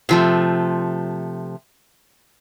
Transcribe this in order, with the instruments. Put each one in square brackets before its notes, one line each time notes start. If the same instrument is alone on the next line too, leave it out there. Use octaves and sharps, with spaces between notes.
[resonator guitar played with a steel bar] C3 F3 A3